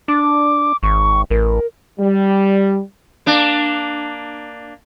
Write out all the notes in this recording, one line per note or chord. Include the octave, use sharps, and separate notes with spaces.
D4 D6
G#1 C#6
A1 A#4
G3
A#3 D4